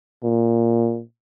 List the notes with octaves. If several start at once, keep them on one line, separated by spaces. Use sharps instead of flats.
A#2